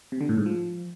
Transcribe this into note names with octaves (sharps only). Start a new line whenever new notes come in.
C3
D3
A2
G#2
F3